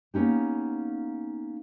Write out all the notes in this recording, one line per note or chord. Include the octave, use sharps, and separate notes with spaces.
A#3 B3 C#4 D#4 G4